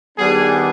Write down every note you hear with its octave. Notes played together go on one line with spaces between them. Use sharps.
D#3 G3 B3 D4 G#4